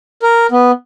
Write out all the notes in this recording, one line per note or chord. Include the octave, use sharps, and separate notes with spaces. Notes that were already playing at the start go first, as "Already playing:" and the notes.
A#4
B3